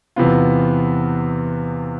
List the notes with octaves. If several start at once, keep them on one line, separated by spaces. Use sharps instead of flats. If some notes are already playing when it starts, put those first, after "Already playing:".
E2 C3 E3 B3 F4